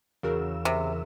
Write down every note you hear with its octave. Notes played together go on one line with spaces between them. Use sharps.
E2 C#3 E3 F#4 A#4 E6
C3